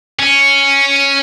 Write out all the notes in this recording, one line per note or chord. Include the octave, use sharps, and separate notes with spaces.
C#4